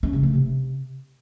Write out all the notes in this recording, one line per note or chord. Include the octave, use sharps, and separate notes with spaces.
C#4
C#3
A3
C3